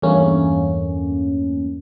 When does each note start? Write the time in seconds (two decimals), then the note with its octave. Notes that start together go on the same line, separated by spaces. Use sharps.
0.02 E2 G2 A3 A#3 C#4